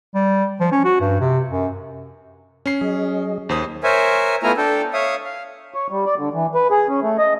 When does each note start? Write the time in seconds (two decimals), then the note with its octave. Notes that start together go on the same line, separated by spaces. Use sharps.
0.15 G3
0.60 F3
0.72 C#4
0.85 F#4
1.01 G2
1.21 C3
1.50 F#2
2.66 C#4 C7
2.81 F#3 G#4 D#5
3.49 D#2 C5 D#6
3.83 A#4 C5 C#5 E5 G#5
4.43 A3 B3 E4 F4 G#5 A#5
4.57 D4 A4 G5
4.93 C#5 E5 F5 D#6
5.24 F5
5.74 C#5
5.90 G3
6.06 D5
6.18 D3
6.34 E3
6.55 B4
6.71 G#4
6.89 C#4
7.02 A3
7.19 D#5